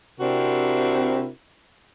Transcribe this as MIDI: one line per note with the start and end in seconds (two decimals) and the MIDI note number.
0.19 1.28 48
0.19 1.28 60
0.19 1.28 62
0.19 1.28 64
0.19 1.28 66
0.19 1.28 70